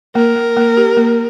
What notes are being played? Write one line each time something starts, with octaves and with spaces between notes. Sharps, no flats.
A#3 A#4
A#3
A#3
G4
A#3